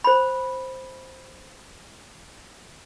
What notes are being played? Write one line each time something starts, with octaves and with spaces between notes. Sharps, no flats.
C5 B5